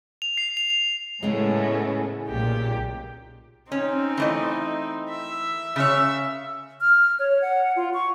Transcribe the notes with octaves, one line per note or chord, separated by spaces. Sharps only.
F7
C7
F7
F7
A2 C#3 G#3 A3 B3 C#4
B1 A#2 G4
C4 C#4 D#4
E3 A3 D#5
E5
C#3 C#5 E5
F6
C#5
F#5
F4
C#6